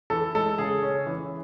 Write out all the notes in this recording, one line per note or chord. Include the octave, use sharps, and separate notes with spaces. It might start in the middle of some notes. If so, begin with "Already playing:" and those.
E3 A4
G#3 A4
C#3 G#4
C#4
E3